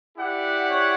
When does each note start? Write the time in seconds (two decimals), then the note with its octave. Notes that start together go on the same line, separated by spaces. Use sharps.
0.17 E4 G4 D5 F#5
0.70 C#5